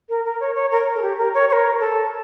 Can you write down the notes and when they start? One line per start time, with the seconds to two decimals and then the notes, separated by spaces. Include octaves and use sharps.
0.09 A#4
0.25 A#4
0.40 C#5
0.55 C#5
0.71 A#4
0.95 A4
1.02 G4
1.18 A#4
1.34 C#5
1.49 C#5
1.53 A#4
1.80 A4